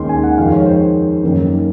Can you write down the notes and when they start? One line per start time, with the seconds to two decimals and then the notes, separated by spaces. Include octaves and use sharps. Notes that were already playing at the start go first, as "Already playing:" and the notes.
Already playing: D#2 D#3 G#3 C#4 C6
0.09 G#5
0.23 F#5
0.38 F2 D#3 G#3 F5
0.52 C#5
0.66 C5
1.24 F#2 D#3 A#3 C#4
1.57 A#4